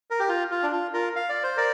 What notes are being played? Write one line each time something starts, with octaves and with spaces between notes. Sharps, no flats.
A#4
G4
F4
F4
D4
F4
F4 A#4
F5
D5
C5
A#4 D5